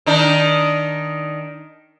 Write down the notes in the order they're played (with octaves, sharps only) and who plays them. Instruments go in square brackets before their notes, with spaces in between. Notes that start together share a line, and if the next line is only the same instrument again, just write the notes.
[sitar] D#3 D4 D#4